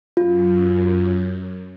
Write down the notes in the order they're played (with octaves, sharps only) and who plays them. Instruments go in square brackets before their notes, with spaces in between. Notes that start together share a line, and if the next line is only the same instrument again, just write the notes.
[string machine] F#2 [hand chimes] F4